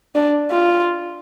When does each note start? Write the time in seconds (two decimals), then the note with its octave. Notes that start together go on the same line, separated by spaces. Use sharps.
0.15 D4
0.51 F4